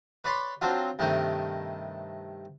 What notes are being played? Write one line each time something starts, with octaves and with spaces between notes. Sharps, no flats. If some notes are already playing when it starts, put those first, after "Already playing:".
B4 C#5 D5 B5 C6
F#3 C4 D4 F4
G2 C3 D#3 A3 A#4